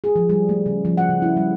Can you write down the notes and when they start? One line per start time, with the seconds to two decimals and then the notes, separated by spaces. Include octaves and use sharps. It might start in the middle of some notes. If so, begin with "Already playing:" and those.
0.04 G#4
0.16 F3
0.29 G3
0.49 A3
0.66 C#3
0.85 F3
0.97 F#5
1.09 C#3
1.22 E4
1.37 G3